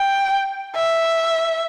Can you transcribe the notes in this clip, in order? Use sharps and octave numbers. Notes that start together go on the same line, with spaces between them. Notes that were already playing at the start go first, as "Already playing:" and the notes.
Already playing: G5
E5